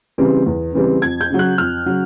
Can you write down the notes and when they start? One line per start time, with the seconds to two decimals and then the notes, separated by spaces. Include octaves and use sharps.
0.18 C#3 E3 G3 C4
0.46 E2
0.74 C#3 E3 G3 C4
1.02 F2 G#6
1.21 G6
1.30 C#3 F#3
1.39 F#6
1.58 F2 F6
1.86 C#3 F#3